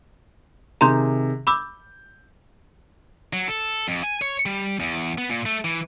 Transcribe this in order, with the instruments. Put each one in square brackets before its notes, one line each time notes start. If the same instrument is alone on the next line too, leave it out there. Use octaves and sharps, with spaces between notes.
[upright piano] C3 D#3 G#4 [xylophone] A#5 C6 G6
[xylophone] B5 D6 E6 [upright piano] G6
[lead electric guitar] F#3
A4
F2
G#5
C#5
G3
E2
B3
A#2
A3
E3